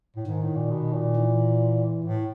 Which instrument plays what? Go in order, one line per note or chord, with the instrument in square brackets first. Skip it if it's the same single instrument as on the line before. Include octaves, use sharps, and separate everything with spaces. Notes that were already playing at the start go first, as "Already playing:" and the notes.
[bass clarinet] A2
[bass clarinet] G#2 [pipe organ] D#3
[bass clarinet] A2
A#2
B2
A#2
[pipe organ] E3
[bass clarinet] A2